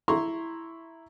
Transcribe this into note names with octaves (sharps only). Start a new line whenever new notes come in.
E4 A#5 C6 C#6